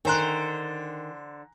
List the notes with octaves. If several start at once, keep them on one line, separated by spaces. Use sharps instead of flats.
D3 D#3 C5 G#5 A#5 F#6